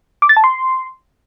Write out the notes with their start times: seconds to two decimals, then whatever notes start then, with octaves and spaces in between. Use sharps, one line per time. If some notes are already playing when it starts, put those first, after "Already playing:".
0.22 D6
0.29 A6
0.37 A5
0.44 C6